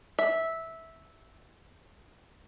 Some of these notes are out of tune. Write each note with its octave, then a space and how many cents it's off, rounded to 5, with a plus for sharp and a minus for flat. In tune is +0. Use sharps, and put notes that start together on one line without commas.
E5 -10